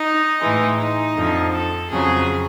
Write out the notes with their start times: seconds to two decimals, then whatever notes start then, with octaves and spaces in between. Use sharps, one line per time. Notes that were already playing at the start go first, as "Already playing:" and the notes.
Already playing: D#4
0.40 A2 E3 G#3
0.79 D#4
1.16 F2 D3 F3
1.55 A4
1.92 F2 C#3 F#3 G#4